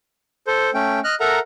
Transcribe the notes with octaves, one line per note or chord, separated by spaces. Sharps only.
A4 C5
A3 C#4 G5
D#5 F6 F#6
A4 A#4 E5 F#5 A#5